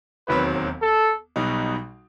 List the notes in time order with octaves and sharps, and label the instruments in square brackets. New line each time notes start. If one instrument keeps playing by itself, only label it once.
[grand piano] E1 D#2 D#3 F#3 C4 [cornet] B4
[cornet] A4
[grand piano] B1 B2 G3 D#4 F#4